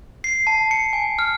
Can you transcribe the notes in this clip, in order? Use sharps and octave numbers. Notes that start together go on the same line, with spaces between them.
C7
A5
C#7
G#5
F6